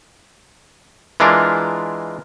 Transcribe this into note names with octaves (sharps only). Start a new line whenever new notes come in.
E3 G#3 D4 F4 A#4